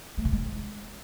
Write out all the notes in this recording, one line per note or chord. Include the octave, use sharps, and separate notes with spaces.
A3
D3
G#3